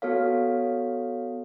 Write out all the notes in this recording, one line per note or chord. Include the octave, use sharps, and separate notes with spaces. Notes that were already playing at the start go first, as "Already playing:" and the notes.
B3 F#4 A4 C#5 F5